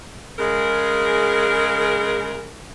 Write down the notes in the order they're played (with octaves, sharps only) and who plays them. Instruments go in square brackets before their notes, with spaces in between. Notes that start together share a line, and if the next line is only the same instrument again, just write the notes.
[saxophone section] C#3 G#3 A#4